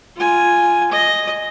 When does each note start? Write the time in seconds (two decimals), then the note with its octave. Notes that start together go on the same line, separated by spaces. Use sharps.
0.16 F4 G#5
0.91 D#5